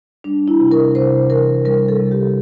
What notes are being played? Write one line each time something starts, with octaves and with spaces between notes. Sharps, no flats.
G3 D4
E4
C3
A#4
C3 C5
E3 A#4
G3 A#4
A4
C3
G4